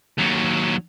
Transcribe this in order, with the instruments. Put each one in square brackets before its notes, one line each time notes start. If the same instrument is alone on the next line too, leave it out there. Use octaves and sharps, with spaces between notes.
[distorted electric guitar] D#2 F#3